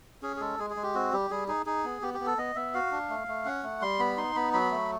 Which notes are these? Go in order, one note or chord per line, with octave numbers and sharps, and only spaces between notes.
C#4 G#4
G#4
G#3 A4
G#3 G#4
G#4
G#3
G4
C4 F#4
G3 G4
G3 G#4
D#4 G#4
D#4 G#4
B3
B3 G4
G4
B3
A4
B3 D#5
B3 E5
F#4 F5
D4
A3
A3
C#4 F#5
A3
G3 C6
B3 B5
D#4 C6
B3 B5
F#3 B5
A3